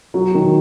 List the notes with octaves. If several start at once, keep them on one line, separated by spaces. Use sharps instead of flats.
F#3
D#3